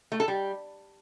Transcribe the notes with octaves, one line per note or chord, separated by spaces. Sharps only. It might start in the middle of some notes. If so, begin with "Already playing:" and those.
A3
A4
G3